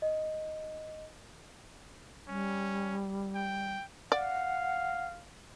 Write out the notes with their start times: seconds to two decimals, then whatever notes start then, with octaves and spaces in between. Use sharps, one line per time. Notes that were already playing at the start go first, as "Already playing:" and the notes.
0.02 D#5
2.28 G3 C#4
3.35 G5
4.12 D5 F5 F#5